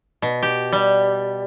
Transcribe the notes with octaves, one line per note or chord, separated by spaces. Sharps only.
B2
G4
G3